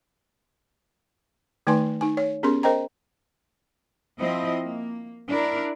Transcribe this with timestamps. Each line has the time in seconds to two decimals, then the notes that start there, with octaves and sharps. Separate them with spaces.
1.67 D#3 A3 D#4 B4 G#5 C6
2.01 D#4 G#5
2.17 C#5
2.43 B3 C#4 G4 G#4 A#4 C6
2.63 A#4 C5 D#5 G5 A#5
4.18 F3 C4 E4 D#5
4.63 A#3
5.28 D4 E4 A#4